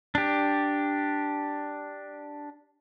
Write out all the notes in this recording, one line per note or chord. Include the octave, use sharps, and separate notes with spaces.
D4 G4